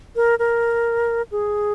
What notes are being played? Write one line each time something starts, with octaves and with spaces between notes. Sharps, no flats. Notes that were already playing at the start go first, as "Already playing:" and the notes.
A#4
A#4
G#4